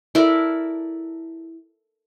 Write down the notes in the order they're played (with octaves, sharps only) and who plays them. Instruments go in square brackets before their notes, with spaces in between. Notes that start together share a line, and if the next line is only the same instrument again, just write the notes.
[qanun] E4 A4 A#4 D5